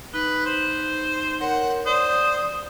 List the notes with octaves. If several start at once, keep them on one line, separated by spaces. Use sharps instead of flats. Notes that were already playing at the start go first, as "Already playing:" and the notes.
D#4 B4
C5
A#4 C#5 F#5 C6
C5 D5 D#6